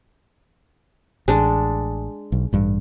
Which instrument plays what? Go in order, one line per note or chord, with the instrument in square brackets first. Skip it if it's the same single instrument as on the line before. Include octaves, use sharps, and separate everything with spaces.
[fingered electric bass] A1 [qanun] G#3 D4
[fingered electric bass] B1
A1 G2